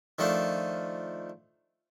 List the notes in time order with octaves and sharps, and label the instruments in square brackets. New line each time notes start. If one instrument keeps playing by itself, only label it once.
[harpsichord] D#3 F3 A3 D4